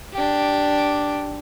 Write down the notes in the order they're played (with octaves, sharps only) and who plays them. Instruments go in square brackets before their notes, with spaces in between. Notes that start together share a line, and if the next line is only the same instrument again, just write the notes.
[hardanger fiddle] D4 G4